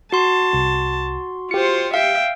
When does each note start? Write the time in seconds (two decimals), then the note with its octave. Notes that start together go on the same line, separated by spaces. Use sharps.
0.12 F#4 A5 C6
0.53 C2
1.51 F4 G4 C5 C#7
1.94 E5 F5 G5